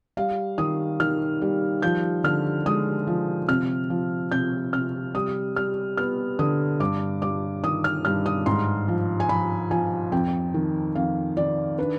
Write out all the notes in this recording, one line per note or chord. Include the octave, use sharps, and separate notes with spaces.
G3 F5
D#3 D#6
D#3 F6
G3
F3 G6
D3 F6
G#3 D#6
F3
C3 F6
F3
C3 G6
C3 F6
G3 D#6
G3 F6
B3 F6
D3 D#6
G2 D6
G2 D6
D#3 D#6
F6
G2 F6
D#6
G#2 C6
F3
G#5
F3 B5
F3 G#5
F2 G5
D#3
F2 F5
D#3 D5
D4 B4